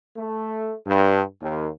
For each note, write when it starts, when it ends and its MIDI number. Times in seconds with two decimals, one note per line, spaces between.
0.17 0.73 57
0.86 1.21 43
1.42 1.68 39